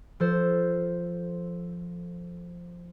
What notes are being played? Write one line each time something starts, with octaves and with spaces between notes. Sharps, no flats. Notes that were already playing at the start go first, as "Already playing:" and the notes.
F3 A4 C5